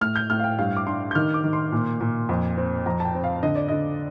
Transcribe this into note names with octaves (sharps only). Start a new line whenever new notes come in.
A2 F6
G6
A2 F6
F5
G5
G2 F5
D6
D4 C6
G6
D#3 F6
D6
D#3
C6
A#2
A#2
F2
C4
F2 A#5
A5
G5
C4
F5
D3 D#5
D5
D3 D#5